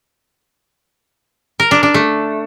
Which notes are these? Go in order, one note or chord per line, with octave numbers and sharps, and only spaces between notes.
A#4
D4
D4
A3